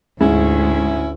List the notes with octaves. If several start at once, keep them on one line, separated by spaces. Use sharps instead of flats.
D2 G#2 C#4 E4